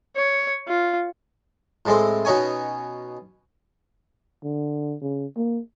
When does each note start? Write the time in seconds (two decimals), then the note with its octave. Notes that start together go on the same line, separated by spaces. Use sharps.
0.17 C#5
0.68 F4
1.86 A2 G#3 C4
2.25 B2 C#4 D#4 C#5 G#5
4.44 D3
5.02 C#3
5.37 A#3